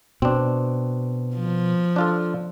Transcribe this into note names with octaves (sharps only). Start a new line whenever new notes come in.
B2 C4 D4
F3
D4 F4 A4